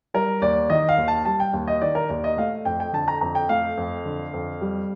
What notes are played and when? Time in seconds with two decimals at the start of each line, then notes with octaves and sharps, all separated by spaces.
0.14 G3 A#4
0.42 D#2 D5
0.70 D#3 D#5
0.89 F5
0.98 D#2
1.08 A5
1.25 G3 A5
1.40 G5
1.53 D#2
1.67 D#5
1.81 D#3 D5
1.95 A#4
2.10 D#2 D5
2.24 D#5
2.37 A3 F5
2.65 F2 G5
2.80 G5
2.93 D3 A5
3.08 A#5
3.21 F2 A#5
3.35 G5
3.49 A3 F5
3.77 F2
4.05 D3
4.34 F2
4.61 G3